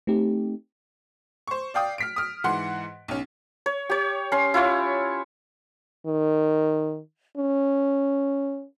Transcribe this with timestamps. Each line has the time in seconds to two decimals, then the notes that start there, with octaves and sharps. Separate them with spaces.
0.07 A3 C4 D#4 G4
1.47 C5 C#6
1.74 D5 F5 G5 D#6
1.98 F6 B6 D7
2.16 D#6 F6
2.44 G#2 E3 F#5 C6
3.08 B1 C#4
3.66 C#5
3.90 G4 C#5
4.32 C#4 C6
4.54 E4 F4 C#5
6.07 D#3
7.37 C#4